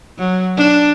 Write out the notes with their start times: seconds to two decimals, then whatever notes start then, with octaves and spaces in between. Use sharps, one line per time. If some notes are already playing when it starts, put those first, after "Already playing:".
0.19 F#3
0.57 D4